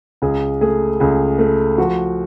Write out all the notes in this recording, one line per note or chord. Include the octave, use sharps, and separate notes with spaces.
C#2 G#4
A3 G#4
C#2 G#4
A3
F3 F#4